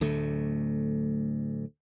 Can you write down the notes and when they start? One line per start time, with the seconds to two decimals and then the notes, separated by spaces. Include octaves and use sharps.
0.01 D1 D2 D3 A3